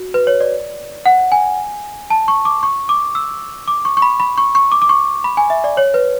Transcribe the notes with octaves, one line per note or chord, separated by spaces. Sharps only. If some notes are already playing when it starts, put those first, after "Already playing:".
Already playing: F#4
B4
C#5
D5
F#5
G#5
A5
C#6
D6
C#6
D6
E6
D6
C#6
C#6
B5
B5
C#6
C#6
D6
D6
C#6
B5
G#5
E5
D5
C#5
B4